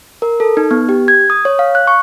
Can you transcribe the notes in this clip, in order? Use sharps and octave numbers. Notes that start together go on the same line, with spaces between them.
A#4
A4
D#4
B3
G4
G#6
D#6
C#5
F5
F#6
C#6